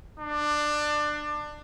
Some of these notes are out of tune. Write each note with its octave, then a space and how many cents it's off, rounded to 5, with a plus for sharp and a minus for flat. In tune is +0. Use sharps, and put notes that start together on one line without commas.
D4 +20